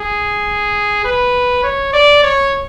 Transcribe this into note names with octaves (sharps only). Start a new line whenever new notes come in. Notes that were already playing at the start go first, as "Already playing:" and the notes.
Already playing: G#4
B4
C#5
D5
C#5